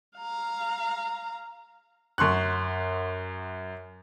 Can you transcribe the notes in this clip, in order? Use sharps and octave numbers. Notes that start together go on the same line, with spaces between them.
F5 A#5
F#2 C6 C#6 F#6